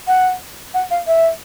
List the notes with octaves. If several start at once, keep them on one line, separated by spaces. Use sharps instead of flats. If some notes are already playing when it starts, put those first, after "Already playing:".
F#5
F#5
F5
E5